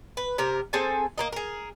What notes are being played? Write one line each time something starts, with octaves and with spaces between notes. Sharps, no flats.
B4
C3 A#4
C4 G#4 A4 G#5
A#3 A#4 D#5
G#4 A#4